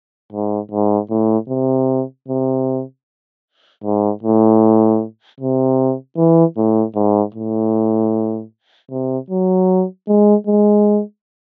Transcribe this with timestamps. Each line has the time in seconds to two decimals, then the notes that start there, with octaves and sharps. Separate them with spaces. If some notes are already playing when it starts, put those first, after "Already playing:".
0.32 G#2
0.71 G#2
1.10 A2
1.49 C3
2.28 C3
3.84 G#2
4.23 A2
5.40 C3
6.17 E3
6.57 A2
6.95 G#2
7.34 A2
8.91 C3
9.30 F#3
10.08 G#3
10.47 G#3